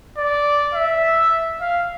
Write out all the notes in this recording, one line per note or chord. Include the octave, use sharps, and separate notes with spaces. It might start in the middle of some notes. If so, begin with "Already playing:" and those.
D5
E5
F5